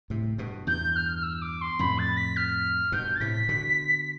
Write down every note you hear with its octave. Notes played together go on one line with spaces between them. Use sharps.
A2 C3
G2 B2
E2 G2 G6
F6
F6
E6
D6
C6
F2 A2 B5
A6
B6
F6
G2 B2 G6
A6
A2 C3 B6
B2 D3